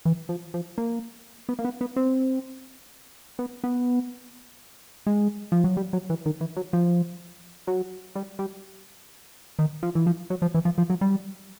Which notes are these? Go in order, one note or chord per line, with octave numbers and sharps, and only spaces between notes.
E3
F3
F3
A#3
B3
A#3
B3
B3
C4
B3
B3
G#3
F3
F#3
G3
F#3
E3
D#3
E3
F#3
F3
F#3
G3
G3
D#3
F3
E3
F3
F#3
F3
E3
F3
F3
F#3
G3